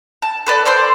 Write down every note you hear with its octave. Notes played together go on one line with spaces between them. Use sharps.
A5
A4 B4 D5
A4 C5 D5 C6